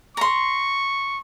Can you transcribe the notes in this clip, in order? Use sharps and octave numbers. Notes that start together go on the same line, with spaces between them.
A#5 C6 C#6